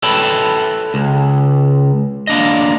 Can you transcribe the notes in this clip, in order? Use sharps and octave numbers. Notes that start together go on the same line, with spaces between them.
A4 B4 C#5 G5 A5 B5
C#2
A#3 D4 D#5